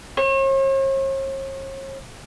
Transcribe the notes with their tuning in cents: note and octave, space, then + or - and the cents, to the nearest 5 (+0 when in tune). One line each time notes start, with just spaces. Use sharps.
C#5 -45